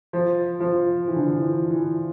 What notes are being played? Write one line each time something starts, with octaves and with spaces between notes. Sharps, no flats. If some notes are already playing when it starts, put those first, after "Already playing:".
F3
F3
E3
D3
E3
E3
E3